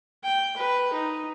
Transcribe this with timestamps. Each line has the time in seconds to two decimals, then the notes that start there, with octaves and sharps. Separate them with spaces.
0.24 G5
0.56 B4
0.93 D#4